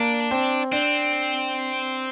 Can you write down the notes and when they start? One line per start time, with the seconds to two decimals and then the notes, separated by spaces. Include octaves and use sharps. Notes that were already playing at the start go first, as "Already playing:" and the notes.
Already playing: A#3 D4
0.31 C4
0.72 C4 D4